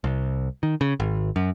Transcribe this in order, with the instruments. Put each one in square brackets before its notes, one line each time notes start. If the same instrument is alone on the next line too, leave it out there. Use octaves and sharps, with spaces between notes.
[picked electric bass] C2
D#3
C#3
G#1
F#2